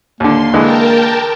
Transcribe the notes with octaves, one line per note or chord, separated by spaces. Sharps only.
D#2 D3 A#3 C6
D3 E3 G#3 A#4 G5 A5